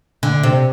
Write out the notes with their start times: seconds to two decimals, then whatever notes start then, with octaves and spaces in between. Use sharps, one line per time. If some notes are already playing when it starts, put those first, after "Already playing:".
0.23 D3
0.43 C3